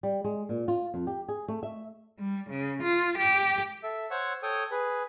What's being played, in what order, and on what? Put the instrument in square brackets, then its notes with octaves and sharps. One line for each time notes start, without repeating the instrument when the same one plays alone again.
[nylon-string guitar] G3
G#3
A#2
F4
F2
G4
G#4
A3
E5
[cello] G3
C#3
F4
G4
[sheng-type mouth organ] A4 E5
C5 C#5 F#5 C#6 E6
A4 C#5 G5 D#6
G#4 B4